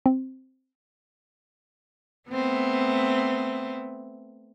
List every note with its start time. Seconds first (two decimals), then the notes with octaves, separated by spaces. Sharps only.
0.06 C4
2.29 A3 B3 C4